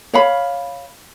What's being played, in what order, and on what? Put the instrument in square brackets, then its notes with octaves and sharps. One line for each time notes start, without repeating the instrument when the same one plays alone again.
[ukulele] C#5 F5 B5